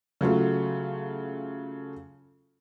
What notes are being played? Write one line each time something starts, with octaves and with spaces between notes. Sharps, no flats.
C#3 F#3 A3 F4